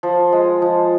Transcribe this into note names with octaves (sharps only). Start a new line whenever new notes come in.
F3
G#3
F3